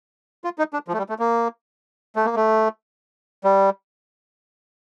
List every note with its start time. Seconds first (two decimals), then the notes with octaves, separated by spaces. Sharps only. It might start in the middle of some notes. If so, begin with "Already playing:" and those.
0.44 F4
0.58 D#4
0.73 D4
0.88 F3
0.93 A3
0.98 G3
1.09 A3
1.19 A#3
2.16 A3
2.25 A#3
2.36 A3
3.44 G3